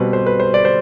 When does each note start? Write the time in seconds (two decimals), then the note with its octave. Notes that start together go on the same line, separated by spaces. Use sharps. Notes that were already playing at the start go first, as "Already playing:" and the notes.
Already playing: B2 G3 C4 B4
0.13 C5
0.26 B4
0.40 C5
0.54 D5
0.65 C5